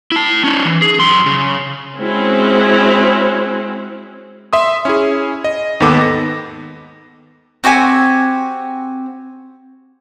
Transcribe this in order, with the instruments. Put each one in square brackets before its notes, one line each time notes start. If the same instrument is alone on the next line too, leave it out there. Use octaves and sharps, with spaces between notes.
[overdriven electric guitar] E4 A5
C#4 D#4
E3
G#4
F#2 C6
C#3
[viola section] G#3 C4 C#4 E4 F#4
[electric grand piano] E5 C6 D#6
C#4 E4 G#4
D#5
D#2 G#2 D#3 B3 A4 D6
A#6
[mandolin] C4 F#4 G4 G#5